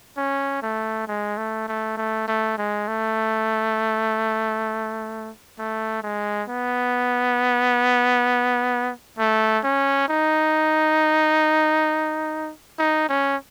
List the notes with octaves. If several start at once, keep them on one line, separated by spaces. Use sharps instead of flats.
C#4
A3
G#3
A3
A3
A3
A3
G#3
A3
A3
G#3
B3
A3
C#4
D#4
D#4
C#4